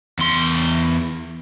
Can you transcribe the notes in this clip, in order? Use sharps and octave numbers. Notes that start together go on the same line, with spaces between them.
E2 C6